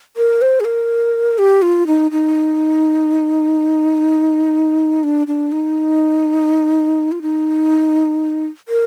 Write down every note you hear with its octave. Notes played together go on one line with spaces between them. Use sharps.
A#4
C5
G#4
A#4
G4
F4
D#4
D#4
D4
D4
D#4
F4
D#4
A#4